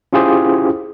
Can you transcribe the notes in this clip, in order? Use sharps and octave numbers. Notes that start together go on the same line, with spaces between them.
C#4 E4 F4 G4 G#4 C5